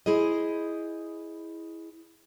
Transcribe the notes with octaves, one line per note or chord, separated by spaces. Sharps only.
E4 G#4 C5 D#5